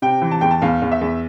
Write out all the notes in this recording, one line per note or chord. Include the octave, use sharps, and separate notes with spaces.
C3 G5
E3
A5
E2 G5
A5
E2 F5
E2
E5
E2